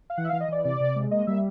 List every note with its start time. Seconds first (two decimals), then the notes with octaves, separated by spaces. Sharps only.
0.10 F5
0.17 E3 F#5
0.24 E5
0.29 F5
0.33 E3
0.40 D#5
0.48 E3 D5
0.64 C3 D5
0.80 C3
0.96 G#3
1.11 A#3 D#5
1.27 G3 E5